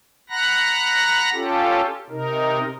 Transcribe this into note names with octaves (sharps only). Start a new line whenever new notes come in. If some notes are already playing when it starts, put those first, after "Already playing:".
F#5 A#5 B5 F#6 A#6
C#4 F4 G4 A4
C3 D#4 A#4